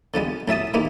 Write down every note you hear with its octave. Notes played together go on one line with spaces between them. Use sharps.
D3 F3 G3 G#3
A1 F#3 E5 A5 D#6
D#2 E3 G#3 A#3